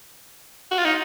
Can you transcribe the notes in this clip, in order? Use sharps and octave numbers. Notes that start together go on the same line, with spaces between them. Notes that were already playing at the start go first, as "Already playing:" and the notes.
F#4
F4
D#4